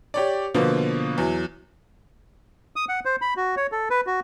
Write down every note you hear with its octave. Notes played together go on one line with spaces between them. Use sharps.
G4 C#5 D5
B2 D3 F3 A#3 B3
E2 F#3
D#6
F#5
C5
B5
F#4
C#5
A4
B4
F#4